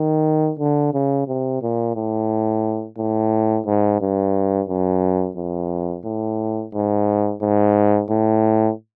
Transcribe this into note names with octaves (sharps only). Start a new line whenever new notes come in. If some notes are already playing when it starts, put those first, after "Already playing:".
Already playing: D#3
D3
C#3
C3
A#2
A2
A2
G#2
G2
F#2
F2
A2
G#2
G#2
A2